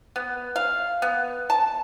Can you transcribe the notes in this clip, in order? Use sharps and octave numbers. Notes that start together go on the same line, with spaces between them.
B3
F5
B3
A5